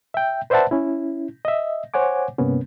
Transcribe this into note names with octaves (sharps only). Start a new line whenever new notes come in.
E5 G5
B4 C5 D5 E5 F#5 A5
C#4 E4
D#5 E5
C5 C#5 F#5 G#5 D6
G2 C3 A#3 B3 C#4